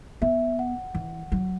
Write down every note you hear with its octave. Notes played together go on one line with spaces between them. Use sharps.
B3 E5
F#5
E3
F#3